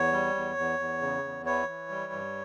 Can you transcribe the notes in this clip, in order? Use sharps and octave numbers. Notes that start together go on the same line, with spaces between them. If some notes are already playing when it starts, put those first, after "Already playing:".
Already playing: E2 C#5
G3
E2
E2
E2
C#3
E2
E3 C#5
E3
G3
G2